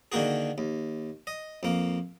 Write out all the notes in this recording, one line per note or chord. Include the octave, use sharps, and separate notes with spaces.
D3 D#3 A#3 F#4 G#4
D#2
D#5
F2 A#3